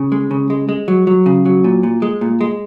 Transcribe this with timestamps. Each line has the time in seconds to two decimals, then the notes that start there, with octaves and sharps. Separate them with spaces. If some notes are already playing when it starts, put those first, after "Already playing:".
Already playing: C#3
0.12 G#3
0.31 C#3
0.50 G#3
0.69 G#3
0.88 F#3
1.07 F#3
1.26 C#3
1.46 F#3
1.64 A#2
1.83 A#2
2.02 G#3
2.21 A#2
2.41 G#3